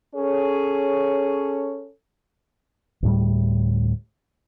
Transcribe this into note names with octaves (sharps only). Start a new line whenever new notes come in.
C#4 G#4 A4 C#5
D2 A2 G3